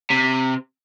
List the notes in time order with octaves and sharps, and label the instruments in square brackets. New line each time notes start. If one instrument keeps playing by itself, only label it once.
[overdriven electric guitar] C3